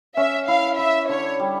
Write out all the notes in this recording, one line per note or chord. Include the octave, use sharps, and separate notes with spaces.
C#4 E5
E4 F5
E4 E5
D3 C#5
G3